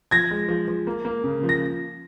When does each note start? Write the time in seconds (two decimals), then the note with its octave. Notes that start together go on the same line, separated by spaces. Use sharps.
0.11 F3 G#6 A#6
0.31 G#3
0.48 F3
0.68 F3
0.87 A#3
1.05 A#3
1.24 C#3
1.43 F3
1.49 A#6